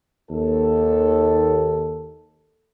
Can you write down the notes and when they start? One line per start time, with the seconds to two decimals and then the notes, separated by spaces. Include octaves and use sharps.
0.30 D#2 A4